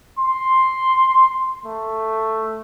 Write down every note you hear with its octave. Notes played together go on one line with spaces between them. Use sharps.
C6
A3